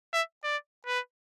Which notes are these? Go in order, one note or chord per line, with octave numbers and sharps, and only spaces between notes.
E5
D5
B4